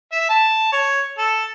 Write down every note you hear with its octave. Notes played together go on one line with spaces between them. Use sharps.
E5
A5
C#5
A4